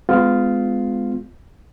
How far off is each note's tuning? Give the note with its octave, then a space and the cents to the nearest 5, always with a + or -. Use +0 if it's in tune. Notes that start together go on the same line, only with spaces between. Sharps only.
G#3 +0 B3 +35 F4 +0